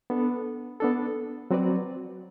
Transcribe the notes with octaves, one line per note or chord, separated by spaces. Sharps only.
B3 D4 A4
B3 D4 A4
F#3 C4 F#4 B4 D5